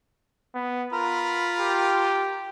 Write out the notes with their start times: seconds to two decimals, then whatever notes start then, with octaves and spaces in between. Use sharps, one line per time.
0.55 B3
0.93 F4 A#4 B5
1.60 G4